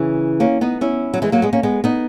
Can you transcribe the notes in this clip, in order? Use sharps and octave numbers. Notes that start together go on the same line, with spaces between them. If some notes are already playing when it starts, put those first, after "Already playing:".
Already playing: C#3 E3
A#3 C#4
B3 D#4
C#4 E4
F#3
E3 G#3
F#3 A#3
G#3 B3
A#3 C#4
G#3 B3
B3 D#4